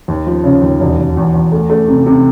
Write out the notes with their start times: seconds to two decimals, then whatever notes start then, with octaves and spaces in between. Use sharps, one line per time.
0.08 D#2
0.27 F3
0.44 C#3
0.62 D#2
0.80 E1
0.98 E1
1.17 E2
1.34 E2
1.52 A3
1.70 A3
1.88 C3
2.06 C3